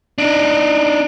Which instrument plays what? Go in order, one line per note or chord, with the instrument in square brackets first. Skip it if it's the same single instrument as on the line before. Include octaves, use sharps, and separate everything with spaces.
[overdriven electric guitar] D4 D#4